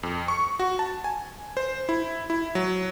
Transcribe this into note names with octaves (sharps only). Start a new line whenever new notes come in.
F2
C#6
F#4
A5
G#5
C5
E4
E4
F#3